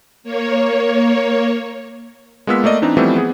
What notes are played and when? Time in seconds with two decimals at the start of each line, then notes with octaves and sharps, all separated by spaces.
0.23 A#3 C#5
2.47 G#3 A#3 B3 F4 E6 B6
2.64 A3 A#3 D5 D#5
2.82 E3 C4 D4 D#4
2.97 E3 F3 G3 A3 B3 C4
3.16 B3 G#4